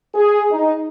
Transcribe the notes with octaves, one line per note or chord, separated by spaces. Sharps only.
G#4
D#4